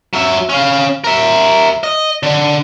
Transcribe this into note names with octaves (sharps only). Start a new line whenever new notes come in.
F#3 E5
C#4 F5
A#4 E5
D#5
D3